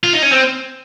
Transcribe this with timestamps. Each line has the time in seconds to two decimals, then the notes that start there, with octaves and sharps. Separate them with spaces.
0.03 F4
0.13 D#4
0.22 C#4
0.31 C4